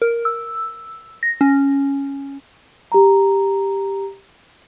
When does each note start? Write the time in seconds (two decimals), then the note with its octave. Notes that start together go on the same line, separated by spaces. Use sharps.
0.02 A#4
0.25 E6
1.23 A#6
1.41 C#4
2.92 G4 A#5